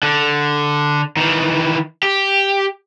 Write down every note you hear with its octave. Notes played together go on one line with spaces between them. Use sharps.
D3
D#3 E3
G4